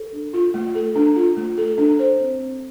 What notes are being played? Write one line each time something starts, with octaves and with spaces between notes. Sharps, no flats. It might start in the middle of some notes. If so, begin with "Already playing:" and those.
Already playing: A4
D4
F4
A3
A4
D4
F4
A3
A4
D4
C5
C4
C4